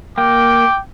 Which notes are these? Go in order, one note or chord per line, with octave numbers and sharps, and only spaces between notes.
A#3 G5 D6